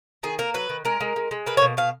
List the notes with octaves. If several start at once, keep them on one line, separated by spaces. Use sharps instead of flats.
D#3 G#4
A#3 A#4
F#3 B4
D#3
G#3 A#4
G#3
G#3
G#3
A#3 B4
C#5
B2
B2 F5